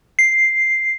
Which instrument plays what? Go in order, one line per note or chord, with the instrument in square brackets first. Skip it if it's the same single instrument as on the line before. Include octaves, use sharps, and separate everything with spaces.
[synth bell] C7